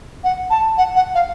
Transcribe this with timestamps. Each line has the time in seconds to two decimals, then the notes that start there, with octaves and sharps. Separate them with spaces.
0.24 F#5
0.50 A5
0.78 F#5
0.95 F#5
1.15 F5